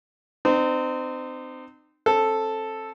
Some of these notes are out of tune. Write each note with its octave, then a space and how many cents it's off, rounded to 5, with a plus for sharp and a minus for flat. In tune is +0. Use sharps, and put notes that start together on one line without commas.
C4 -25 D#4 -40
C4 +30 A4 +0